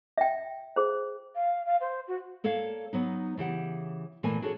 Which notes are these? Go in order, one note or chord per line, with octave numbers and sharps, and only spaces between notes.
E5 G5
G#4 C5
F5
F5
C5
F#4
A#3 A4 C#5 D5 F5
F#3 B3 D#4
C#3 E3 G4 F#5
A#2 E3 A3 A#3 G#5
D4 F#4 G#4 A4 C5 C#5